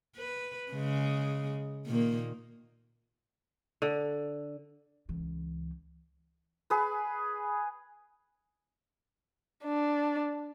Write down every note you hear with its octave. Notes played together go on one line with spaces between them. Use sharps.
B4
C#3 G#3
A#2 D#3 A#3
D3
C#2 E3
G#4 B4
D4